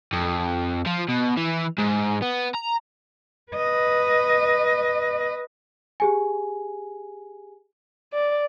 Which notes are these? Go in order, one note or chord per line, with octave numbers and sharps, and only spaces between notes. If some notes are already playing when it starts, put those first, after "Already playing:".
F2
F3
B2
E3
G#2
B3
A#5
B4 D#5
G4 G#4 G#5
D5